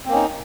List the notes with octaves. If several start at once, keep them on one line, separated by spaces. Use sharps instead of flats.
A#3 C4 C#4 D#4